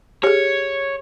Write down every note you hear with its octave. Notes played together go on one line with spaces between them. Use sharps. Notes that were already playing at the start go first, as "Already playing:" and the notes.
G4 G#4 C#5